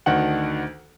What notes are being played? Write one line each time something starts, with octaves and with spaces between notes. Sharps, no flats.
D2 D#3 D4 F#4 F#5 F#7